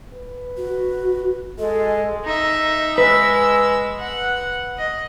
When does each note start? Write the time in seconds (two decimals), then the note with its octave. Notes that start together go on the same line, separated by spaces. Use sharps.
0.13 B4
0.57 F#4
1.58 G#3 A4
2.24 D#4 E5
2.98 G#3 B4 E6
3.99 F#5
4.78 D#5